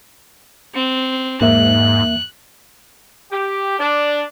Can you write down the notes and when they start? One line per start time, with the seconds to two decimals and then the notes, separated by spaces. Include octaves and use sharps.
0.74 C4
1.41 E2 G#2 A#3 E5 F#6
3.31 G4
3.79 D4